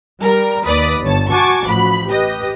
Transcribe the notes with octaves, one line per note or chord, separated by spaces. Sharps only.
G3 A#4
D#2 B4 D5 D#6 B6
G1 C#5 A5
F#4 G#5 A5 C#6 D6
A1 F3 F#4 B5
G4 B4 D#5